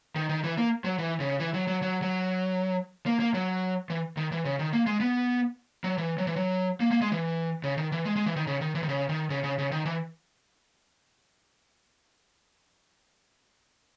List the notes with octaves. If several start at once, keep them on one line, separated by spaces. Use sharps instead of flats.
D#3
D#3
E3
A#3
F#3
E3
C#3
E3
F#3
F#3
F#3
F#3
A#3
A#3
F#3
E3
D#3
E3
C#3
D#3
A#3
G#3
B3
F#3
E3
F#3
E3
F#3
A#3
A#3
G#3
E3
C#3
D#3
E3
G#3
G#3
E3
D#3
C#3
D#3
E3
D#3
C#3
D#3
C#3
C#3
C#3
D#3
E3